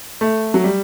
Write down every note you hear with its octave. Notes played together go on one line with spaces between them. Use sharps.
A3
F#3
G3